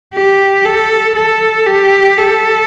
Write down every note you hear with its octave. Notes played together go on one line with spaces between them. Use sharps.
G4
A4
A4
G4
A4